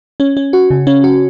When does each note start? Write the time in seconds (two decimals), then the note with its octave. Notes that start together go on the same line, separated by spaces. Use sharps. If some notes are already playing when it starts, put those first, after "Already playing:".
0.20 C#4
0.37 C#4
0.53 F#4
0.70 C#3
0.87 C#4
1.04 F#4